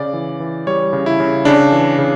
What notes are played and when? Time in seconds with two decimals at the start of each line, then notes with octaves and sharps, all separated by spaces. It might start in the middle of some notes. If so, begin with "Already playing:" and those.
Already playing: C#3 D5
0.13 E3
0.40 E3
0.67 G3 C#5
0.93 C#3
1.06 E4
1.20 C#3
1.45 C#3 D4
1.72 E3
1.98 C#3